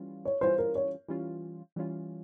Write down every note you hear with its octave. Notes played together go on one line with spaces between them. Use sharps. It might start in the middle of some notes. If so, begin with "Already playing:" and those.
Already playing: E3 G3 C#4 F4
C#5
E3 G3 C#4 F4 C5
A#4
C#5
E3 G3 C#4 F4
E3 G3 C#4 F4